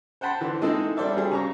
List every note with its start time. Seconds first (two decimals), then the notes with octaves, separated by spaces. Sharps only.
0.21 C5 F#5 G5 A5 B5 C6
0.41 D3 E3
0.61 G#3 A#3 C4 D#4 E4 A4
0.97 G3 D4 A4 C5 D5 E5
1.16 F#3 G3 D4 G4 G#4
1.31 C#3 A#5 C#6